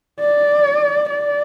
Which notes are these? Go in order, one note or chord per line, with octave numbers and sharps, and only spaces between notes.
D5
D5